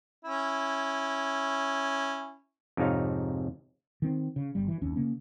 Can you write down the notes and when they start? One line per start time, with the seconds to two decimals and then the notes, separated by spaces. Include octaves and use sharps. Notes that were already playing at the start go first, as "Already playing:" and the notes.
0.25 C#4 E4
2.77 F2 G#2 C3 D#4 C#5 F5
4.02 D#3 C4
4.36 C#3
4.55 G1 G3
4.68 E3
4.81 F#1 D#2 C#4
4.96 C#3 A#3 C#4